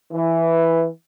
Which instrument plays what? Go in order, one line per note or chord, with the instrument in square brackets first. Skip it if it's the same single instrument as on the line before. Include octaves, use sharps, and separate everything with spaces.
[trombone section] E3